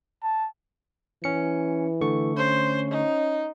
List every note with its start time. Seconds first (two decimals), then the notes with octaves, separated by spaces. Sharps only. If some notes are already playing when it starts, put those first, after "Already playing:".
0.23 A5
1.24 E3 C#4 C#7
2.01 D3 A3 C#6
2.37 C#4 C5
2.90 D#4